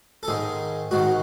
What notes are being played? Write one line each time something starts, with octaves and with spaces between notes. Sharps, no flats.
A4
G#2 D#3 G#4
G#2 D#3 F#4